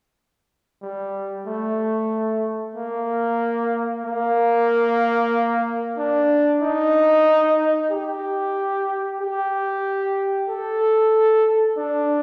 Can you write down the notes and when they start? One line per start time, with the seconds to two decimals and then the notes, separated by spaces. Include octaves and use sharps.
0.82 G3
1.47 A3
2.75 A#3
4.04 A#3
5.98 D4
6.62 D#4
7.91 G4
9.20 G4
10.49 A4
11.78 D4